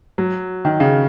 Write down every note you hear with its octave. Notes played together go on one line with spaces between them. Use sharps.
F#3
D#3
C#3